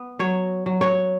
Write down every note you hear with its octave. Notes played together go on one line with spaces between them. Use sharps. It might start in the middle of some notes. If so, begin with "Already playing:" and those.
Already playing: B3
F#3 C#5
F#3
C#5